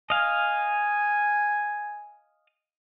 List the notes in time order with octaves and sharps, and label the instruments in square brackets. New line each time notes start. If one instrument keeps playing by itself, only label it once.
[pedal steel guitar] D#5 F5 [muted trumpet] G#5